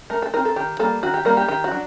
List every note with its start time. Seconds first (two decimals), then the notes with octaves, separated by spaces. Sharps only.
0.10 A3 A#4
0.22 A4
0.34 C4 D#4 A#4
0.45 A4
0.56 D#3 G4
0.79 G3 A#3 A4
1.03 D#3 F#4
1.14 G4
1.25 G3 A#3 A#4
1.37 G4
1.49 D#3 G4
1.64 F#4
1.71 F#3 D4